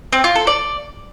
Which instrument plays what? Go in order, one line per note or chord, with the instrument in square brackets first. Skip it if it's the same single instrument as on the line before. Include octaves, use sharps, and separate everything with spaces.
[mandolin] C4
F4
A4
D5